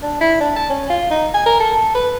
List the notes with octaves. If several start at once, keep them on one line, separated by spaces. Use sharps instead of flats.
D4
E4
D4
A5
C#4
F4
D#4
G#5
A#4
A4
B4